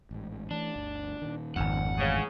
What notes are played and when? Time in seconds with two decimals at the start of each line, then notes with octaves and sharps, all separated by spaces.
0.11 A1 G#2
0.51 E3 A3 D4
0.76 G1 D2
1.22 A#2 D#3
1.56 G#1 F2 F#5
1.98 A2 C#3 E3 G#3